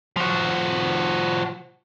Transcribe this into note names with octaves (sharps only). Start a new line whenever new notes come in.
F3 F#4